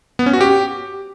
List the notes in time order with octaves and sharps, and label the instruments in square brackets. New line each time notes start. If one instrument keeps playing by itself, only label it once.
[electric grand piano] B3
C#4
F#4
G4